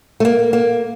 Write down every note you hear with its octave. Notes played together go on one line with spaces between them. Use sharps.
A3
A#3
A#3